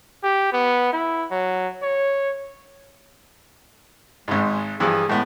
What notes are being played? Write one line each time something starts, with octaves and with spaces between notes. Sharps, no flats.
G4
B3
E4
F#3
C#5
G#1 G#2 G#3
G2 E3 F3 G#4
A2 G#3 B3